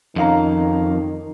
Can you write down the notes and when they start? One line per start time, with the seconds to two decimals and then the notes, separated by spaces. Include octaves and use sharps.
0.16 F2 D#3 C#4 F5 A#5